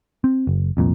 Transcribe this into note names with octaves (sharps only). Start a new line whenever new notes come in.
C4
F#1
C2 F2 A#2